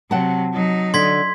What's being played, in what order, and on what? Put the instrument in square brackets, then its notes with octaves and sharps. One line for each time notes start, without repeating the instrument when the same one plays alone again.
[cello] C3 F#3 [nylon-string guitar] F#5 G5 A5
[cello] F#3 D#4
[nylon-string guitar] D3 [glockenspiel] C6 G#6 B6